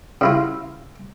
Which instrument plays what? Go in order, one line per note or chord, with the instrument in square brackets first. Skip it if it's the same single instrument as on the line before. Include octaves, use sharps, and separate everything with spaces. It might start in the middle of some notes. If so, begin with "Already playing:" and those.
[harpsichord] C#3 E4 F4